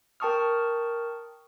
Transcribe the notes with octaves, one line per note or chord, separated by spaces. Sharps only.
A#4 G5 A5 C#6 D#6 F6